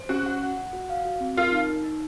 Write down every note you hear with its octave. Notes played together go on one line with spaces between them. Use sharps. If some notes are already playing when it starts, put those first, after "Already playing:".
Already playing: C5
C#4 F#4
F#5
F#5
F#5
F#4
F5
F#4
C4
F4 A#4
D#4
D#4
D#4